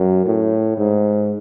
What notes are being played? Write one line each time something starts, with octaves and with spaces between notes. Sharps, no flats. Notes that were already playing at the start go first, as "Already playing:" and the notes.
Already playing: F#2
A2
G#2